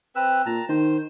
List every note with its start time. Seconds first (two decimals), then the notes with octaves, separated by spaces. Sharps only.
0.16 C4 B4 E6
0.46 A#2 A5 A#5
0.69 D#3 C5